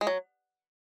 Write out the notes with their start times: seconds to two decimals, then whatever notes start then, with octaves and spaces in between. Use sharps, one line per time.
0.01 G#3
0.07 F#3